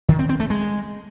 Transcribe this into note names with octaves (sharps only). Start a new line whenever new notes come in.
D#3
C4
C4
A3
G#3